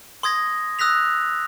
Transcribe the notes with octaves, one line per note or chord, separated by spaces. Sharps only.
C6 D#6 G#6 A#6
D#6 E6 F#6 A#6 B6 F7